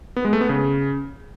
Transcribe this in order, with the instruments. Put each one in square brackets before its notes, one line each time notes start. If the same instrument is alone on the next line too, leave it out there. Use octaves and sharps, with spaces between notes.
[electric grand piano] B3
G#3
A3
B3
C#3